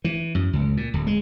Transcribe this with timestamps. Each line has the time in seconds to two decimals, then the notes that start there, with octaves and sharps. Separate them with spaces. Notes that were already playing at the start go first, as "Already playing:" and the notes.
0.04 E3
0.35 F#2
0.53 C#2
0.77 A#2
0.94 D1
1.07 G#3